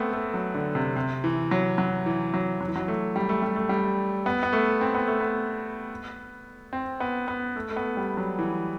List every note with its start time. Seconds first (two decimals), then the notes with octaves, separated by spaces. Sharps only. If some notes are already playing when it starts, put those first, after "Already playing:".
Already playing: A3 B3 C4
0.13 A3
0.34 F#3
0.54 D3
0.75 C3
0.96 C3
1.24 E3
1.51 F#3
1.78 F#3
2.06 E3
2.34 F#3
2.61 F#3
2.68 E3
2.76 F#3
2.88 A3
3.16 G3
3.29 A3
3.42 G3
3.56 A3
3.69 G3
4.26 B3
4.43 B3
4.53 A3
4.81 C4
4.95 B3
5.08 A3
5.20 B3
6.73 C4
7.00 B3
7.28 B3
7.56 A3
7.71 A3
7.76 B3
7.97 G3
8.17 F#3
8.39 E3